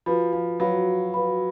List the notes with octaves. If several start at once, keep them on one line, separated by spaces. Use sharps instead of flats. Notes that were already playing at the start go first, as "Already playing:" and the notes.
F3 F#4 B4 F5 B5
F3
F#3 F#4 B4 F5 B5
F#4 B4 F5 B5